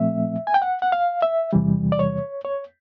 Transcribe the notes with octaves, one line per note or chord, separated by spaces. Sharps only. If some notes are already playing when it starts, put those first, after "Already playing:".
Already playing: A#2 F3 A3 C4 E5
G#5
G5
F#5
F#5
F5
E5
E2 C3 E3 G3
D5
C#5
C#5